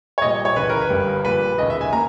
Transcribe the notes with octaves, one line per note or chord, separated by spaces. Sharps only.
C#5
A#1 A#2 G3 D#5
C#5
C#2 C#3 E3 B4
A#4
B4
G1 G2 G3
A#1 A#2 G3 B4
E1 D#2 C#3 D#5
E5
G#5
A#3 A#5